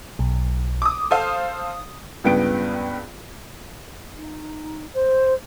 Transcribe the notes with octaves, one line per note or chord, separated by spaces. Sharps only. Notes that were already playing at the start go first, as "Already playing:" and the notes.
B1
D6 D#6
A4 C5 F5 D#6
C#2 G2 B3 G5 D7
D#4
C5